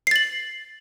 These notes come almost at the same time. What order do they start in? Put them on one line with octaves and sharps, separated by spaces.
C7 A6 F#7